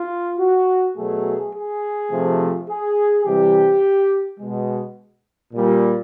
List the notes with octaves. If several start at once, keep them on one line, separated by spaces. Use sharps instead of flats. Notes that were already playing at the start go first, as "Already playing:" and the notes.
Already playing: F4
F#4
B2 F#3 A3 G#4
G#4
C3 F3 A3
G#4
C3 E3 G3 G4
B2 G#3
A#2 G3